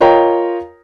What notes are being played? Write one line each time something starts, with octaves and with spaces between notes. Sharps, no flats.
F4 A#4 C#5 D#5 G5 A#5